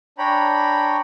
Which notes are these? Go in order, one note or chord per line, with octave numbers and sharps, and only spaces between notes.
D4 C#5 G5 A#5 B5